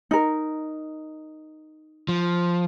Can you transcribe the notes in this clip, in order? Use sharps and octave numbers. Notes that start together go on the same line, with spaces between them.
D#4 A#4
F3